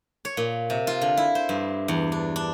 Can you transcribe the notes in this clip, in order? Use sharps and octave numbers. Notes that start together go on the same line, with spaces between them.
C#5
A#2
C3
F4
D3
E4
C5
G2
E2
D4
D4